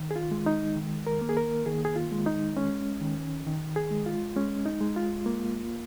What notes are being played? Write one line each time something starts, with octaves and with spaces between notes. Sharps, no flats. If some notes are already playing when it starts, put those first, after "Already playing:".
Already playing: D#3
G#4
F4
G#3
D#4
D#3
A#4
A#3
G#4
A#4
D#3 G#4
G#4
F4
G#3
D#4
G#3 C#4
D#3
D#3
G#4
G#3
F4
G#3 C#4
D#4
G#3
F4
A#3